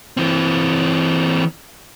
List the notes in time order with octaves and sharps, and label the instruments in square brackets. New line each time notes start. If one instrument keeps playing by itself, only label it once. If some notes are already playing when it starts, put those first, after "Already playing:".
[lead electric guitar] E3 C4